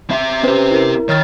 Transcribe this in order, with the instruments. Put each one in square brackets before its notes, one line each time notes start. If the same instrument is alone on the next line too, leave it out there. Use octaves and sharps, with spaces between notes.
[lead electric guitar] C4 E5
[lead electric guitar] C4 G4 [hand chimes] C#4 B4 C5
[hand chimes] E4 A#4
[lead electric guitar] D#3 [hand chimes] C#5 F6 A6